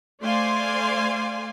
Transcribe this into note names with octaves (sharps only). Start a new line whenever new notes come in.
A3 C5 D5 F5 G#5 C6